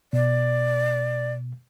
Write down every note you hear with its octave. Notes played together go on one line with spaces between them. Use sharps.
B2 D5